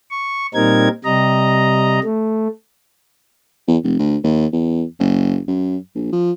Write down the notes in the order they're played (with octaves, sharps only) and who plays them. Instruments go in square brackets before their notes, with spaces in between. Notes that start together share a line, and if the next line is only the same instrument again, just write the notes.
[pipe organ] C#6
A#2 G3 C4 D#4 A#4 G#6
C3 G3 D#5 A#5
A3
[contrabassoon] E2
F1
D2
D#2
E2
F#1
F#2
A#1
F3